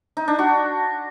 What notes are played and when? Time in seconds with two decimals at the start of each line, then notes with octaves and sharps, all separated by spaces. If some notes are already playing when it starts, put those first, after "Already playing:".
0.17 D#4
0.28 D4
0.39 F#4